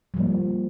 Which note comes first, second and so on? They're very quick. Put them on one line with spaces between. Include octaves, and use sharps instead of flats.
G3 F3 A#3